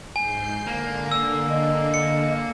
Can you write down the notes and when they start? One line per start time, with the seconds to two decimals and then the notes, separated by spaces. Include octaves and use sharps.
0.16 G#2 G#5 G6 C7
0.67 D3 A#3
1.12 E6
1.50 D#5
1.94 C#7